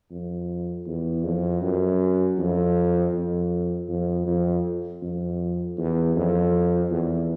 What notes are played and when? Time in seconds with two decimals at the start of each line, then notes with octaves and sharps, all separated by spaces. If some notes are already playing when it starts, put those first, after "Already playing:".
0.11 F2
0.87 E2
1.24 F2
1.62 F#2
2.38 F2
3.13 F2
3.88 F2
4.26 F2
5.02 F2
5.78 E2
6.16 F2
6.91 E2